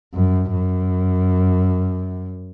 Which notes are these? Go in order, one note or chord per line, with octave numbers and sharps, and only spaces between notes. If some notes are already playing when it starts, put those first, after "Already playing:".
F#2
F#2